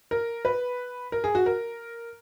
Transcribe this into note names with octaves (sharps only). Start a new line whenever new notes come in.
A#4
B4
A#4
G#4
F#4
A#4